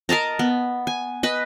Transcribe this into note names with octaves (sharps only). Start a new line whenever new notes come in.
A#4 D#5 A5 A#5
B3
G#5
B4 D#5